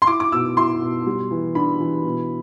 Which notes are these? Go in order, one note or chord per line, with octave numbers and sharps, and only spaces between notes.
C6
E4 D6
D6
B2 E6
E4 C6
B2
G3
E3
D4 B5
E3
B2